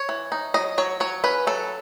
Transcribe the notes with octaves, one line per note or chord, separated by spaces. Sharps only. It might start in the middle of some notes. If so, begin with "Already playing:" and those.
Already playing: C#5
E3
D#4
F#3 D#5
F#3 C#5
F#3 C#5
C#4 B4
F#3 A4